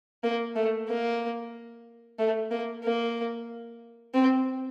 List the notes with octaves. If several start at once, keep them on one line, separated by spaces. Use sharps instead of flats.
A#3
A3
A#3
A3
A#3
A#3
C4